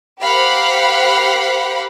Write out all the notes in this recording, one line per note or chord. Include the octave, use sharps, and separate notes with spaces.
G4 A#4 C5 F5 F#5 B5